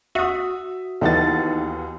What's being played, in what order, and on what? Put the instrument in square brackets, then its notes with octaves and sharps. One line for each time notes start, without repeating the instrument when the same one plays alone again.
[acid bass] F#4 [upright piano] E5 D#6
[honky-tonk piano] D#2 B3 A6 [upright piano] E3 D#4 A4